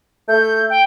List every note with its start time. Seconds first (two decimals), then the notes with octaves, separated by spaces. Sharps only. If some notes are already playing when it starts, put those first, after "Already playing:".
0.28 A3 G6
0.70 G5